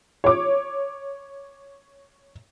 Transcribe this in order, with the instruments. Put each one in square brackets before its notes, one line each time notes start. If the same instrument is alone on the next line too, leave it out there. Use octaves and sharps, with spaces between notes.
[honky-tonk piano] C#5 D6